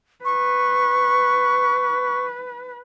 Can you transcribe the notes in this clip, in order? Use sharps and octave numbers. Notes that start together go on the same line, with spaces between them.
B4 C#6